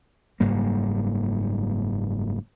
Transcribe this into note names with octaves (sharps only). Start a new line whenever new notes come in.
F#1 G#2 G3 A#3